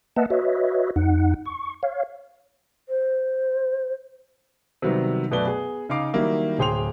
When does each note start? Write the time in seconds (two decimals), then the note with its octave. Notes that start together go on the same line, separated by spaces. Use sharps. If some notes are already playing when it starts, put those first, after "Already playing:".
0.16 A#3 B4 D#5 E5 F#5 A5
0.30 F#4 B4 C#5 D#5 E5
0.96 F2 D#4 F#5
1.45 C#6
1.83 C#5 F5
2.88 C5
4.82 C3 D#3 F#3 G3 B3
5.31 F#2 B2 A3 B4 D5 G7
5.46 B3 G#4
5.89 C#3 D#4 F5 D6 C7
6.13 D#3 F#3 G3 A#3 E4
6.58 D1 G#4 C5 G5 C6 F7